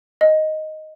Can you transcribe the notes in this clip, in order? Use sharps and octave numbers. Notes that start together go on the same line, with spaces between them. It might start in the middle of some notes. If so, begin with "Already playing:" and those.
D#5